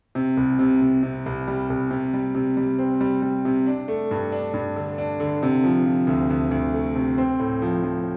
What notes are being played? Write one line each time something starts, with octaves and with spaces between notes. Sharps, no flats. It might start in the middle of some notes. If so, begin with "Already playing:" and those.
C3
C2
C3
C3
C3
C2
G3
C2
C3
G3
C3
G3
C4
G3
G3
C3
D4
A3
G2
D4
G2
D3
D4
D3
C3
F3
F3
D2
D2
D2
A3
C3
C4
A2
F3
F3